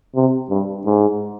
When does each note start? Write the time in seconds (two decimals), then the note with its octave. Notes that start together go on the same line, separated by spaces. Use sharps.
0.15 C3
0.50 G2
0.85 G#2